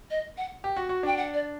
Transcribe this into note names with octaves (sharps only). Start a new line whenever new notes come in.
D#5
F#5
G4
F#4
F#4
D4 G5
F#5
D5